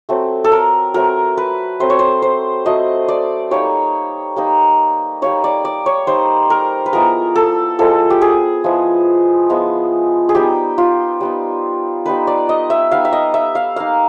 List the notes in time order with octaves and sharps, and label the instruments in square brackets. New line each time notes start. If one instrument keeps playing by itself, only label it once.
[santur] F#3 A3 C4
A4
A#4
F#3 A3 C4 A#4
B4
F#3 A3 C4 C5
C#5
C5
C5
F#3 A3 C4 D#5
D5
G3 A#3 D#4 C#5
G3 A#3 D#4
G3 A#3 D#4 C#5
D5
D5
C#5
G3 A#3 D#4 C5
A#4
B4
F3 G#3 B3 E4 A#4
A4
F3 G#3 B3 E4 A4
G4
G#4
F3 G#3 B3 E4
F3 G#3 B3 E4
G#4
G3 B3 D#4 G4
F4
G3 B3 D#4
G3 B3 D#4 B4
D5
D#5
E5
G3 B3 D#4 F5
E5
D#5
E5
F5
A#3 D#4 F5